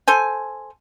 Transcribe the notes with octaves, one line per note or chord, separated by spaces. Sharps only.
A4 C5 G#5